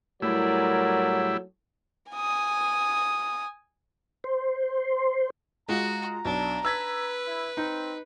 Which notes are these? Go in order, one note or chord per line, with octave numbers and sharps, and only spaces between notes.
A2 F#3 G3 E4 A#4 D5 G#5
G#5 D#6
C5
G#3 F4 F#4 A#5
B1 D4
B4 E6 G#6 B6
E4
C4 D#4